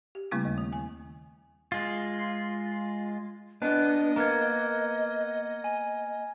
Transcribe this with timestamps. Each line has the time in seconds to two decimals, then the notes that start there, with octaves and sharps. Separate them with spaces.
0.15 G4
0.31 C#3 G3 A3 A#3 C4 E4
0.45 D#2
0.58 D#3
0.73 G#5
1.72 G#3 F4
3.62 B3 D4 D#5
4.16 A#3 B3 A#5 F6 G#6
5.64 G#5